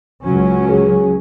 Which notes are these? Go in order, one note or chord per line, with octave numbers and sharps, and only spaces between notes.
C#2 F#3 C#4
G#4